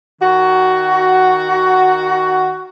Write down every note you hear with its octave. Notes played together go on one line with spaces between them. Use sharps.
D#3 F#4